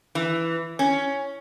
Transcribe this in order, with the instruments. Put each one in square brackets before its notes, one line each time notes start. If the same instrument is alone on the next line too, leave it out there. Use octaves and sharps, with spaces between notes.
[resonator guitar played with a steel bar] E3
C#4